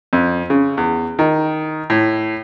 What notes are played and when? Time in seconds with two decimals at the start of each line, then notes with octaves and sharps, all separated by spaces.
0.13 F2
0.50 C#3
0.77 E2
1.19 D#3
1.90 A2